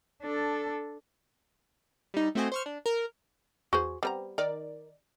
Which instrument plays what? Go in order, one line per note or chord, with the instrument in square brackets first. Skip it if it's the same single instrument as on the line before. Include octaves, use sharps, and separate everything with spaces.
[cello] D4 A4
[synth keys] G3 D#4
A3 C4 F#4 C5 D#5 G#5
C5 C#6 F6
D4
A#4
[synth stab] E2 [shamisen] F#4 G#4 C5
[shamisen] G3 B4 A#5 [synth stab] B3 C4
[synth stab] D#3 D#4 D5 [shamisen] A#4